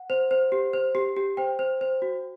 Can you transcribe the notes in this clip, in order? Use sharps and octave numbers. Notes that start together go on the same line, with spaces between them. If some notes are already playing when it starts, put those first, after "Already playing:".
Already playing: F#5
C5
C5
G4
C5
G4
G4
C5 G5
C5
C5
F#4